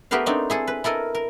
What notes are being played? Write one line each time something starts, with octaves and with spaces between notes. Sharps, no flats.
A3 B3 G4 A#4 B4 F5
A3 C4 D4 D#4
E4 G#4 A4
B4
E4 A4 A#4 D#5
A#4